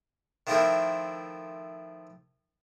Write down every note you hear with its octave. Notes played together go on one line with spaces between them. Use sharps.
D#3 F3 A3 C4 E4 A#4